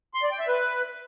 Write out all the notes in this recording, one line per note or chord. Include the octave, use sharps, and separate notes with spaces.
C6
D5
G5
E5
B4